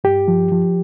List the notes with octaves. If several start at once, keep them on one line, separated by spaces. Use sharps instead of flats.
G2 G4
F3
F3